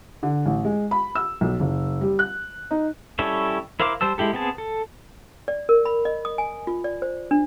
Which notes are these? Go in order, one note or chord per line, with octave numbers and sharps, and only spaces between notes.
D3
A1
G#3
B5
E6
B1
F#1
G3
F#6
D#4
G3 C#4 E4 A4 C#5
E4 A#4 C5 F5 D6
G3 C5 A5 E6
G#3 E4 G4 A4
B3 C4 G#4 A5
A4
D5
A#4
B5
D#5
D#6
G#5
F4
D5
C5
D4